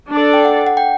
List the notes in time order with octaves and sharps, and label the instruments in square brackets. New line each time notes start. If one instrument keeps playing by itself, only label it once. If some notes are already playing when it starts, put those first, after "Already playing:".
[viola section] D4 A4 D5
[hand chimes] G5
F#5
F#5
G5